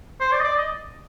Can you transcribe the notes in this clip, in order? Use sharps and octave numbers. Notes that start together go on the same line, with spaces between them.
C5
D5
D#5
D5
D#5